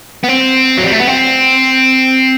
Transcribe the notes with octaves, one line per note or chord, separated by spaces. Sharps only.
B3
C4
F#3
G3
A3
B3
C4